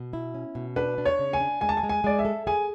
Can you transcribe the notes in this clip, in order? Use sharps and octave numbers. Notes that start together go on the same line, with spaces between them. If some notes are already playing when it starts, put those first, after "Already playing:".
Already playing: B2
E4
C#4
B2
D4 B4
D4
C#5
C#3
G#5
D4
G#3 G#5
A5
G#5
G#3
G#5
G#3 D5
E5
A4
G#4 G#5